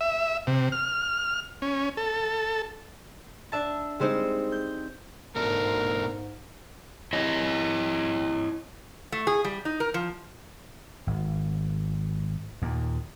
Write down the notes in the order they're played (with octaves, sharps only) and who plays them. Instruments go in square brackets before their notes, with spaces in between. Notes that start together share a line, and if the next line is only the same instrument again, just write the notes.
[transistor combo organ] E5
C3
F6
C#4
A4
[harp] D4 E5 A5
G3 G#3 C4 D#4 C5
G6
[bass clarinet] G#2 [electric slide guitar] B2 A3 D4 [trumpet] A#4
[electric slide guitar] E4 C#5 D#5
[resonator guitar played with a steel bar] A3
G#4
G3
D#4
A#4
F3
[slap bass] G#1
D#2 A#2